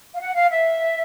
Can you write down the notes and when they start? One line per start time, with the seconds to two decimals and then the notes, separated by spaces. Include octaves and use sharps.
0.15 F5
0.21 F#5
0.35 F5
0.50 E5